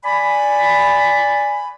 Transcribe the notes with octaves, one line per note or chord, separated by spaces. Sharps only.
D5 G#5 B5